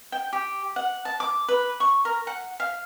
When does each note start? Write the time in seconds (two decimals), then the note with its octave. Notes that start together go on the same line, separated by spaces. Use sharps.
0.12 G5
0.33 G4
0.76 F#5
1.05 A5
1.20 D6
1.49 B4
1.80 C#6
2.05 A#4
2.27 F#5
2.60 F5